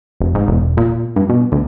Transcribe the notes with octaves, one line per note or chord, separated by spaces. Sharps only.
F1
G#2
E1
A#2
G2
B2
D2